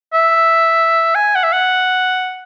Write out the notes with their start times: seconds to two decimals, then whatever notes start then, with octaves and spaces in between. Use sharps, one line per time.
0.14 E5
1.15 G#5
1.35 F#5
1.44 E5
1.53 F#5